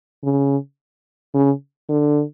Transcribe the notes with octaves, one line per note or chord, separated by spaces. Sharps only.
C#3
C#3
D3